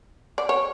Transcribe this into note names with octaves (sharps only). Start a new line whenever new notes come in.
D5
C#5